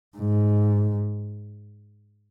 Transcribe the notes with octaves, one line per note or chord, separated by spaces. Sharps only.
G#2